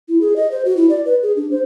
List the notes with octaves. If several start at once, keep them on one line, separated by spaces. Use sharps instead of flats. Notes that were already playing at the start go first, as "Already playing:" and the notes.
E4
G#4
D#5
C5
F#4
E4
D5
B4
G#4
D4
C5